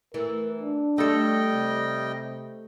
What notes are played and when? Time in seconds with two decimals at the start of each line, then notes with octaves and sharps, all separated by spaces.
0.14 E3 A3 A#4
0.61 D4
0.98 G3 A3 A4 D#5 G5
1.52 C3